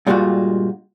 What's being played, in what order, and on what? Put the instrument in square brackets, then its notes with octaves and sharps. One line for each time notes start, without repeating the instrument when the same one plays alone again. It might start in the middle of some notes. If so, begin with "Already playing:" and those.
[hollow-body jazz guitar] G2 A#2 G3 G#3 F4 F#4